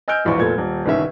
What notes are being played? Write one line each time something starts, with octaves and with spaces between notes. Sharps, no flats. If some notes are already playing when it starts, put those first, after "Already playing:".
D#5 G#5 E6 F6 G6 D7
E1 A#1 E2 E4 C#6
F1 A#2 B3 A4 G#6
D#1
G1 C2 D#3 C#4 E5